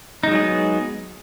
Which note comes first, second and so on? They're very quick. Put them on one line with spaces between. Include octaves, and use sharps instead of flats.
D#4 G#3 F#3 G#4 B3